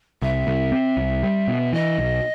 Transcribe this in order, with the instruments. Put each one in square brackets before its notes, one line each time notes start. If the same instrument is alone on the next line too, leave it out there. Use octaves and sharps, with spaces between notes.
[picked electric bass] C2 [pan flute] E5
[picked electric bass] C2
C4
C2
G3
B2
[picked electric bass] E3 [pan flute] D#5
[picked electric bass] B1